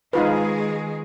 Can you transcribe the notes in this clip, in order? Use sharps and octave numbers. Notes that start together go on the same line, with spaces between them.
D#3 G#3 D#4 F4 G#4 B4